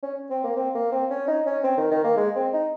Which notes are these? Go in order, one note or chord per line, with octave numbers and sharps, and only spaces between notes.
C#4
C4
A#3
C4
A#3
C4
C#4
D#4
C#4
C4
D#3
D#3
A#3
G#3
C4
D#4